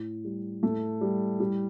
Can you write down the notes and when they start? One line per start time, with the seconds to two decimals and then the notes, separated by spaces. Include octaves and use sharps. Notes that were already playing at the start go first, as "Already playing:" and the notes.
Already playing: A2
0.24 G3
0.63 A2 A3
1.01 G3
1.40 A2 G3